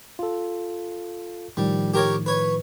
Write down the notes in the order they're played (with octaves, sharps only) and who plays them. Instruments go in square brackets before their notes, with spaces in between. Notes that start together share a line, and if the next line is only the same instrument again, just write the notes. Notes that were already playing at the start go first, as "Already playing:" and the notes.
[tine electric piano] F4 A4
[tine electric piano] A2 D#3 F3 [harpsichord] G3
[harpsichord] G4 A#4 C#5
B4 C#5